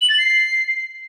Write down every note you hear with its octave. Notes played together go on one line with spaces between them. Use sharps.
F#7
A6
C7